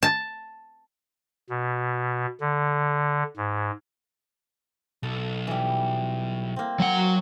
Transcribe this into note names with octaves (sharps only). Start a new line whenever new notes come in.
A5
B2
D3
G#2
B1 A4
E3 G3
A#3 C4
F#3 F#5